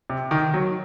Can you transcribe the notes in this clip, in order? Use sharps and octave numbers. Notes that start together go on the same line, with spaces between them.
C3
D#3
F#3